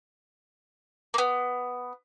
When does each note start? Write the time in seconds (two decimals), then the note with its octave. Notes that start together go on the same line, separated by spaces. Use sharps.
1.14 A#3 B3